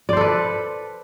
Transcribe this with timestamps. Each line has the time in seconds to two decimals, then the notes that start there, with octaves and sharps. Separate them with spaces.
0.09 D5
0.13 C5
0.17 A4
0.21 B4